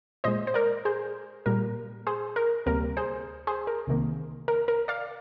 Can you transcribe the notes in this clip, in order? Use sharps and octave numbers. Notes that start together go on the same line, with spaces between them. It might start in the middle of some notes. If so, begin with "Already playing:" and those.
A#2 G#3 C5 D#5
C5
A#4 D5
G#4 C5
A#2 G3 A#3 A#4
G#4 C5
A#4
D2 C3 G3 A#3 A#4
G#4 C5
G#4 C5
A#4
C2 C3 D#3 A#3
A#4
A#4
D5 F5